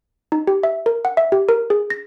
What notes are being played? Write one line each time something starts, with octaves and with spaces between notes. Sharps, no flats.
D#4
G4
E5
A#4
F#5
E5
G4
A#4
G#4
A#6